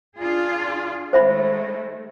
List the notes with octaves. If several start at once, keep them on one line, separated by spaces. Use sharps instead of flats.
D4 F4 G#4
D#3 G#3 A3 C5 E5 B5